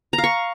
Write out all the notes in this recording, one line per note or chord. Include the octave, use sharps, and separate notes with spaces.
A#5
F5
C#6